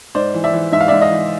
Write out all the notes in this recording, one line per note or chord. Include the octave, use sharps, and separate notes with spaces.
G#2 C5 D5
E3
D5 E5
E3
G#2 E5
F5
G#2 D5 E5
D#5 F5
E3